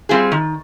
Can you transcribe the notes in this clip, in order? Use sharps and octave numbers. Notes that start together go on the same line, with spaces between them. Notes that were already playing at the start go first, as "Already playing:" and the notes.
G3 C4 F4 G#4
D#3